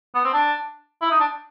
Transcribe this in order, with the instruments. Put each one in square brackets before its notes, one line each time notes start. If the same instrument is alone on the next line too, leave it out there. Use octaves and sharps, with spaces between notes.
[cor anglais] B3
C4
D4
E4
D#4
D4